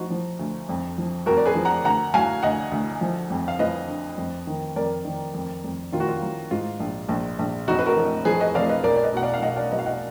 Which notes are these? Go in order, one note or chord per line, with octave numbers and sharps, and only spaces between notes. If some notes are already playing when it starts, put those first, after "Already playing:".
Already playing: F3 D#4 F4 F#4
F3
D2
F2
F3
F2 F#4 A#4
D5
G#4 B4
F3
F#5 A#5
D2 F#5 A#5
F#3 F5 G#5
D2 D#5 F#5
D2
F3
F2
F5
F3 B4 D#5
D3
F2
D#3
F2 A#4 D5
D#3
F2
F2
D#3 F4
F#4
F4
F#3
G#2 F4
A#1
A#1
A#1
F1 D#4 F#4
B4
F#4 A#4
F1
F3 G#4 B4
B4 D#5
F1 D5 F5
B4 D#5
B1 A#4 D5
D5
B4 D#5
B2 F#5
D5 F5
F5
B1 D#5 F#5
D5 F5
F#3 B4 D#5
F5
D#5 F#5